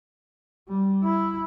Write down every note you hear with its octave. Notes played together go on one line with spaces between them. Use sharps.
G3
E4